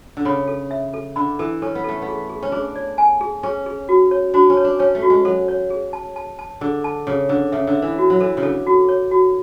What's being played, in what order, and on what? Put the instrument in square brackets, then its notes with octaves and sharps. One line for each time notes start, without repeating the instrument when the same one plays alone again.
[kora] D3
[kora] C#3 [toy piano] B5
[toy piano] A4
E5
A4
[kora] D3 [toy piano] B5
[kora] E3 [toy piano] A4
[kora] C#4 [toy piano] A4
[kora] B3
[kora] A3 [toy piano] A4
[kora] B3
[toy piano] G#4
G#4
[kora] C#4
[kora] D4 [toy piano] G#4
[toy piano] D5
G#5
G#4
[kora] C#4 [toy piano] G#4
[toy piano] G#4
F#4
C#5
[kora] D4 [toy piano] F#4
[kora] C#4
[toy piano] C#5
[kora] D4
[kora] C#4 [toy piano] C#5
[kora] A3
[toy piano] F#4
[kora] G#3
[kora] F#3 [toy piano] A4
[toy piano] C#5
G#4
A5
A5
A5
[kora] D3 [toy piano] G#4
[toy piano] A5
[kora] C#3 [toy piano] G#4
[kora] D3 [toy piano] G#4
[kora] C#3 [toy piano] E5
[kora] D3
[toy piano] E5
[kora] E3
[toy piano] F#4
[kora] F#3
[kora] E3 [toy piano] A4
[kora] C#3
[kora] D3 [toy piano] A4
[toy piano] F#4
C#5
F#4